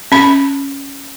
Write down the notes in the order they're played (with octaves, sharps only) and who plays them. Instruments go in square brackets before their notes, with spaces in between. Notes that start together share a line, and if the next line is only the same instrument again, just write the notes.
[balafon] C#4 B5